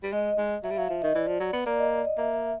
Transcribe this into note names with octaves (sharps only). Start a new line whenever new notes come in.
G3
G#3 D#5
G#3
F#3 E5
G3
F#3 F5
F3 E5
D#3 D#5
E3 D5
F3
F#3
B3
A#3 D5
D#5
D5
D#5
A#3 E5
E5